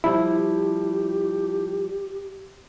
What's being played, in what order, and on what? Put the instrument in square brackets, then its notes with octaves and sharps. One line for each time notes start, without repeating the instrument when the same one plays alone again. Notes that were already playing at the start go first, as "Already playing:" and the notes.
[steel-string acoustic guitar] F3 G3 [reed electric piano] E4 [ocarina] G4